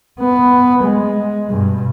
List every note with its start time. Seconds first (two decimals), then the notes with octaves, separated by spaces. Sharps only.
0.20 B3
0.83 G#3
1.50 G2 B2